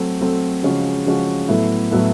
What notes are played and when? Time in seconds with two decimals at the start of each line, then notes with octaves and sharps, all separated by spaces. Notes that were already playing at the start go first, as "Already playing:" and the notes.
Already playing: F#3 A3 C4
0.21 F#3 A3 C4
0.63 C#3 F3 G#3 C#4 F#4
1.06 C#3 F3 G#3 C#4 F#4
1.49 A2 F#3 B3 E4 A4
1.91 A2 F#3 B3 E4 A4